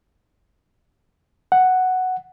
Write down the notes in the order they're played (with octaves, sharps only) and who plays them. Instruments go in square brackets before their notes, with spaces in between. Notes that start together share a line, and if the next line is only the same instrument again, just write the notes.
[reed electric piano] F#5